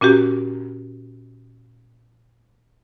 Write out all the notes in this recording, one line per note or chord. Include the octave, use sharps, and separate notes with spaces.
A#2 C#4 F#4 G4